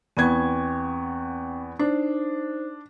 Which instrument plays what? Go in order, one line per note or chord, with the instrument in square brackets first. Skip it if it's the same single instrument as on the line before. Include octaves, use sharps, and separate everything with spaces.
[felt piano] E2 B3 G#6 [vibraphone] C4 G5 C#6
[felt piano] D4 [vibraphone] D#4 C5